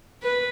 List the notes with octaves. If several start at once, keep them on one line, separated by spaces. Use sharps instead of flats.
B4